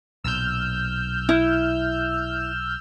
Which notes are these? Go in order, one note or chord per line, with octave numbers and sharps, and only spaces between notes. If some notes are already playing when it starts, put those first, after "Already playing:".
B1 A#2 E6 F6 G6
E4